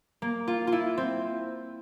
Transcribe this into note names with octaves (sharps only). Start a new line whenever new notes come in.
A#3
F4
F4
E4
C4